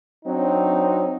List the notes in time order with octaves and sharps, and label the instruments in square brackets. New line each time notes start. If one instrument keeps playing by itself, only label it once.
[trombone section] F#3 C4 D4 D#4